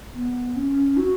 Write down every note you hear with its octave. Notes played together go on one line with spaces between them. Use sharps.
B3
C#4
F#4